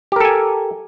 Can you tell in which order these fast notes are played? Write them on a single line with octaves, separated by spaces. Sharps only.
G4 A#4 A4 G#5